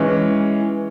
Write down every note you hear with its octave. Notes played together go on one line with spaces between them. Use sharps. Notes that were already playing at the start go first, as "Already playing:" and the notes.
Already playing: E3 G#3 C#4